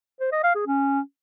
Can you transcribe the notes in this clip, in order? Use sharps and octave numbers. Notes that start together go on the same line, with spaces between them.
C5
D#5
F5
G#4
C#4